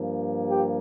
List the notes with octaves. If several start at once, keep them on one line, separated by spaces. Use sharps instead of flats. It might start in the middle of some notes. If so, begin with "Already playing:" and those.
Already playing: G2 F3 A#3
G4